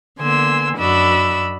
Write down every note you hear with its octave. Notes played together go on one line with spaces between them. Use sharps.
D3 A#3 B3 G#5 C6 E6
F#2 D4 F#4 D#5 B5 E6